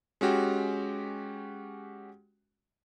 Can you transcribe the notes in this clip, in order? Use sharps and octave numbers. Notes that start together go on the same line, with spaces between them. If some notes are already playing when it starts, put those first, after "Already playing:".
G#3 C#4 F#4 G4